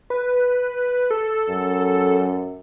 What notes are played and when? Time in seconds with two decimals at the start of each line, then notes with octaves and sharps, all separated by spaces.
0.10 B4
1.11 A4
1.49 F#2